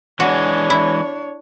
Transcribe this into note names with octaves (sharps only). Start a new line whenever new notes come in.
E3 G#3 D4 F#4 C#5
E4